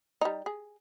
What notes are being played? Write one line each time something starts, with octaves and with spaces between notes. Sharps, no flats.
G3 D#4
G#4